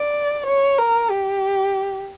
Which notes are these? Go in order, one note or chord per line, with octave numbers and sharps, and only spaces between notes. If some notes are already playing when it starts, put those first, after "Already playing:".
Already playing: D5
C#5
A#4
G4